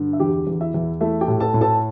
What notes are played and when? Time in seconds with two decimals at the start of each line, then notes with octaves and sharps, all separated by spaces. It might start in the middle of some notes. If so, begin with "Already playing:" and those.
Already playing: G2 D3
0.13 E5
0.20 E2 G4 G5
0.47 E2
0.60 E4 E5
0.74 E2
1.01 A3 E4 E5
1.21 G4 G5
1.28 A2
1.40 A4 A5
1.54 A2
1.61 A4 A5